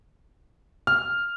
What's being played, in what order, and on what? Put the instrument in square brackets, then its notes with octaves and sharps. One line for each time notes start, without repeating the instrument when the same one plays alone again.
[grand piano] F6